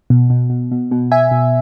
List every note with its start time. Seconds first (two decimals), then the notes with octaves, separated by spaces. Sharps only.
0.10 B2
0.30 B2
0.50 B2
0.71 B2
0.91 B2
1.12 B2 E5 G#5
1.31 B2